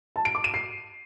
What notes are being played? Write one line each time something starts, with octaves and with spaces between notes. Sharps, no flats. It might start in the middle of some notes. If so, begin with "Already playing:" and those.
A5
D7
D6
D#7
C7